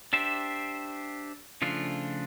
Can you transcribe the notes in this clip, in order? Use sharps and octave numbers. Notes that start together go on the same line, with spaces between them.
D4 G4 C5 E5
C#3 F3 A3 D4 F4